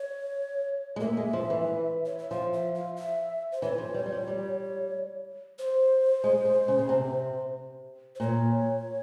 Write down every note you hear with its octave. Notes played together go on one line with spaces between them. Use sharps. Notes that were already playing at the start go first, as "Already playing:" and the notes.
Already playing: C#5
G#3
A#3 E5
G#3
F3
E3
C#5
E5
F3 F5
E5
F5
E5
C5
E3 C#5
F3
G3
G3
F3
G3
C5
G#3
G#3
C#3
C#3
C3
C5
A#2 C#5